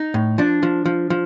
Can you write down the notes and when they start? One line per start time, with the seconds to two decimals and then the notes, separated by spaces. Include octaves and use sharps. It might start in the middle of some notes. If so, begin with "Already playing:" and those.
Already playing: D#4
0.14 A2
0.38 F3 D4
0.63 F3
0.86 F3
1.10 F3